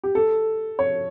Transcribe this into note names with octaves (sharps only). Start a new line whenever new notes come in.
G4
A4
C#5